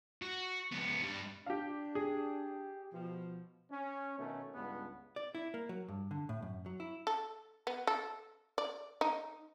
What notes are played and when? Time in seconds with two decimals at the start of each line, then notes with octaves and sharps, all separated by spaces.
0.22 F#4
0.72 C#2 B3
1.03 G2 G3
1.46 D4 G4 F5
1.95 G4 G#4
2.93 B2 F3
3.71 C#4
4.19 B2 D#3 A3 C#4
4.54 C#2 G2 B3
5.16 D5
5.35 E4
5.54 A#3
5.69 F#3
5.88 G2
6.11 D3
6.29 A2
6.42 F#2
6.66 F#3
6.80 E4
7.07 A4
7.67 B3
7.87 A4
8.58 D5
9.01 D#4